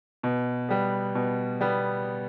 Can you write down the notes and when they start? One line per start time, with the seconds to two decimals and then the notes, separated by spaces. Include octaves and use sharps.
0.23 B2
0.69 G3 B3
1.15 B2
1.61 G3 B3